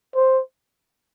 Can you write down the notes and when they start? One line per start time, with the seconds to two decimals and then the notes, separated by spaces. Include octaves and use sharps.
0.16 C5